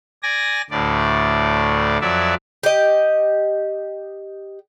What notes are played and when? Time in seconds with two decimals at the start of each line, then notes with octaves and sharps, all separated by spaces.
0.23 D5 G#5 A#6
0.70 D2 A2 D5
2.01 F2 F#3 D5 E5
2.63 G4 D#5